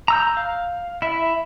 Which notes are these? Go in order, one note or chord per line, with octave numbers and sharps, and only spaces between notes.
A#5 E6 G6
F5
E4 E5